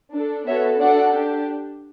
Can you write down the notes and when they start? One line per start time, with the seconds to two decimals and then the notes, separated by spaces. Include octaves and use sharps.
0.14 D4 A4
0.47 B3 F#4 A4 C#5 E5
0.80 D4 F#4 A4 D5 F#5
1.14 D4 G4